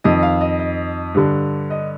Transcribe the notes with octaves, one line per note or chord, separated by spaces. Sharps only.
F2 D#3 D#5
F5
D#5
D#5
G2 D3
D#5